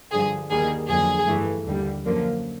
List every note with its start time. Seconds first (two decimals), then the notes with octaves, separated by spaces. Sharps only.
0.12 G2 D3 F3 G#4
0.50 D#2 D#3 G3 A#3 G#4
0.88 F2 D3 F#3 A#3 G#4
1.27 G2 E3 A3
1.66 D#2 D3 G3
2.04 F#2 D3 F3 A#3